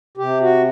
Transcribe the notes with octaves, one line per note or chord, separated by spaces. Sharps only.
C3 G4
F#4